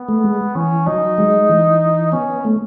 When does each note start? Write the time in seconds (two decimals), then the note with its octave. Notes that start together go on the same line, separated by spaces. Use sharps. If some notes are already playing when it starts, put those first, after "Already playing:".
Already playing: B3
0.09 A3
0.24 G#3
0.55 E3 C#4
0.87 F#3 D#4
1.18 G#3
1.49 E3
2.12 B3 C#4
2.45 A3